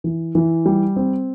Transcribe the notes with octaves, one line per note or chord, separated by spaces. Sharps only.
E3
E3
G3
C4